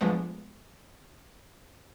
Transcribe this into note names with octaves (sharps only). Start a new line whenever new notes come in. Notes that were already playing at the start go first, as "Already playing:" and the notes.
F3 G#3 A3 B3 D4